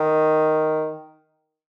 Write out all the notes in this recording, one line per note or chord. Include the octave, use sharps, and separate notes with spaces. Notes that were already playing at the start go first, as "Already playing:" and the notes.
Already playing: D#3